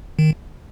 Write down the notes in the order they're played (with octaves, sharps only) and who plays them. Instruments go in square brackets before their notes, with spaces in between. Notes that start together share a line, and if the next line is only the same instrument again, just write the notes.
[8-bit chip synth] D#3